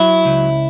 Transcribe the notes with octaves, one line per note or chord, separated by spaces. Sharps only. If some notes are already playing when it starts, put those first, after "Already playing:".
Already playing: F#3 E4
C#2